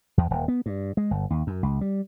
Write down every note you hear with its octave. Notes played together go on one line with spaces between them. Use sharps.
E2
D#1
B3
G2
G#3
G1
D#2
F#2
C#2
G3